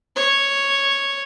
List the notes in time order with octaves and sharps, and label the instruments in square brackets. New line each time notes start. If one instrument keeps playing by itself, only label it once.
[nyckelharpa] C#5